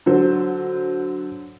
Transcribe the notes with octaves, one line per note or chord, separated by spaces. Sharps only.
D3 F#3 C5